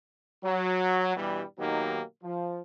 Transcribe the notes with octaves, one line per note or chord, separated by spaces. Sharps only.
F#3
G2 B2 E3 G3
B2 D#3 F#3 A#3 D#4 G4
F3